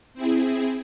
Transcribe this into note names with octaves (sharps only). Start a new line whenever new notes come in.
C4 E4 G#4